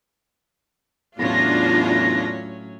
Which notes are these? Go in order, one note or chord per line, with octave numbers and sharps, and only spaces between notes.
E2 A2 F#3 C#4 D4 F4 A#6